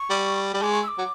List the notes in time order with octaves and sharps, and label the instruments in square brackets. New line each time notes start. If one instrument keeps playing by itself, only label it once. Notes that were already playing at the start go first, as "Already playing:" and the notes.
Already playing: [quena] C#6
[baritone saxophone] G3
G3
[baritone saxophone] G#3 [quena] D6
[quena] C#6
E6
D6
[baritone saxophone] F#3